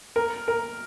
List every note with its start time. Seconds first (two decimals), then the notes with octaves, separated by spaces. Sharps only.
0.16 A#4
0.48 A#4